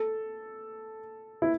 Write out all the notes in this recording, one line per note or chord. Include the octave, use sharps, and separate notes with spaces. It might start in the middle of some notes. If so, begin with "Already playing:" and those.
Already playing: A4
E4